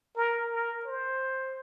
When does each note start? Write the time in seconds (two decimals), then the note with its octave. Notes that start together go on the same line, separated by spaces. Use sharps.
0.17 A#4
0.52 A#4
0.85 C5